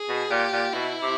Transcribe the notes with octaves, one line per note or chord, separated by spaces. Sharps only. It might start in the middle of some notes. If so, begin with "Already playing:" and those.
Already playing: G#4
B2
A#2 G4
A#2
B2 E4
C3